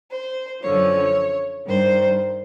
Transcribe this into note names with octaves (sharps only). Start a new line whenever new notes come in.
C5
F#2 D3 F3 C#5
G2 D#3 C5